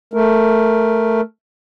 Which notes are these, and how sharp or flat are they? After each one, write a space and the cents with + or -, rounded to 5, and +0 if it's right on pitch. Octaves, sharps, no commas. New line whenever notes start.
A3 +0 A#4 +0